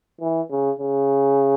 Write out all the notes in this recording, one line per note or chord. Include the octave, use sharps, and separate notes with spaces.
E3
C#3
C#3